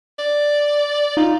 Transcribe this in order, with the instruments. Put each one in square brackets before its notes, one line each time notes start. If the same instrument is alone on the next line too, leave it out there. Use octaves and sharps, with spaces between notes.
[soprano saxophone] D5
[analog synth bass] D#4 [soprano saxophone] F4